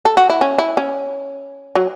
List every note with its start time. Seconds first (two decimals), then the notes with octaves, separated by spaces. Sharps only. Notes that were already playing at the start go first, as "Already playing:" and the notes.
0.05 A4
0.17 F#4
0.30 E4
0.41 C#4
0.58 E4
0.77 C#4
1.75 F#3